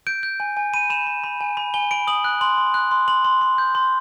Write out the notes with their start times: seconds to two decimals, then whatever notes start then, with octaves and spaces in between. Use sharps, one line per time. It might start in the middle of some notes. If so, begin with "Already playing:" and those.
0.07 G6 D7
0.23 G6
0.40 G#5
0.57 G#5
0.74 B5 D#7
0.90 B5 E7
1.07 B5
1.24 B5
1.41 G#5
1.57 B5
1.74 G#5 G7
1.91 B5 D7
2.07 D#6 F#7
2.24 F#6
2.41 C6 F#7
2.58 C6
2.74 F#6
2.91 C6
3.08 C6 F#7
3.25 C6
3.41 C6
3.58 G6
3.75 C6